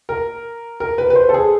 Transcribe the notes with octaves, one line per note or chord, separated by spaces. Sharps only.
A#4
A#4
B4
B4
C5
A4
G#4